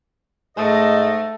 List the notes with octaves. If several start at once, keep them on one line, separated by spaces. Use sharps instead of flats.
G#2 A3 D#5